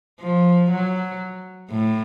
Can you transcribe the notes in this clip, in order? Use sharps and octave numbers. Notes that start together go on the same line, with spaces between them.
F3
F#3
A2